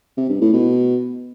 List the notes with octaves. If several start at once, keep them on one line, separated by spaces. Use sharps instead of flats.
C3
G2
A2
B2